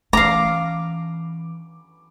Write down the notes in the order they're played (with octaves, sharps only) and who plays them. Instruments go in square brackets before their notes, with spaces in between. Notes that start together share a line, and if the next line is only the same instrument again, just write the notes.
[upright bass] E3 C#4 [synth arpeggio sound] A3 [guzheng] F5 A#5 [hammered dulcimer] D6